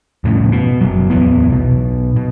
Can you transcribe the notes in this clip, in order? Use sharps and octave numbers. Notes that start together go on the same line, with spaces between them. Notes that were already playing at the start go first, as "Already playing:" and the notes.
F2 A2 C#3
B2
F#1 F#3
D1 E2 E3 B3
B1 B2
B2